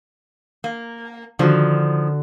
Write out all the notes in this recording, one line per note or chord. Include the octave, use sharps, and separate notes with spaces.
A#3
D3 D#3 F3 F#4